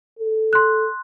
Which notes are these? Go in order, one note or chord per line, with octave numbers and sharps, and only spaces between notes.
A4
C6 F#6